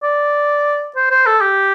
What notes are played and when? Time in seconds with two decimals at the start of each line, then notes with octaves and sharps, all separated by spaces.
0.03 D5
0.96 C5
1.11 C5
1.26 A4
1.41 G4